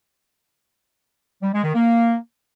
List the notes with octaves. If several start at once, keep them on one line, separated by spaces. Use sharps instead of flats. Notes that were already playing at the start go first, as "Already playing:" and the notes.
G3
G#3
D#3
A#3